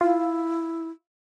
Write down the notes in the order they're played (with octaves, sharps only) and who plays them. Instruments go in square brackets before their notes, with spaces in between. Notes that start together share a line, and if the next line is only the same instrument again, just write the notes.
[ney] E4 [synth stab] F4